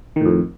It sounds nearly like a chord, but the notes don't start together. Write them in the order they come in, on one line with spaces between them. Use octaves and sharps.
D#3 A2 F2